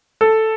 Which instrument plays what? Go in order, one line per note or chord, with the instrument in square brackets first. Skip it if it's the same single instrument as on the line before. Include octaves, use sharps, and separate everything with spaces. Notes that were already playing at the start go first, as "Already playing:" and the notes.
[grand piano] A4